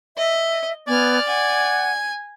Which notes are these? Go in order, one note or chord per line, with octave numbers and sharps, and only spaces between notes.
D#5 E5
B3 D5 G#5 F6
F#5 G#5